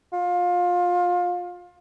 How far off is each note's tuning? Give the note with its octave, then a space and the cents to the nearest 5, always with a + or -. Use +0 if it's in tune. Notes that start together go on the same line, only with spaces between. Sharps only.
F4 +25